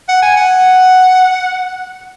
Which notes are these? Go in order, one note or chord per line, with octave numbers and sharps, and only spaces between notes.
F#5
G#5
F#5